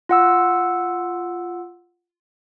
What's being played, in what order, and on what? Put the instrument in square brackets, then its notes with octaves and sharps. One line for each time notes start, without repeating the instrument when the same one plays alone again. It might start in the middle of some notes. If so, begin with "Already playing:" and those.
[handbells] F4 F#5 E6